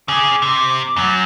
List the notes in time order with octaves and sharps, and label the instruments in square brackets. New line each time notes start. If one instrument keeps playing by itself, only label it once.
[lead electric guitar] C#3 G#4 [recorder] D6
[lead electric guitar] C3
F#2 F#3